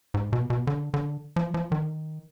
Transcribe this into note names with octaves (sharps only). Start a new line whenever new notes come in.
G#2
B2
B2
D3
D3
F3
F3
D#3